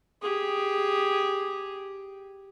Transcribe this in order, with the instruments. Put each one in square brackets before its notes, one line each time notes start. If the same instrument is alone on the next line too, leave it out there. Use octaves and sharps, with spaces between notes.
[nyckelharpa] G4 G#4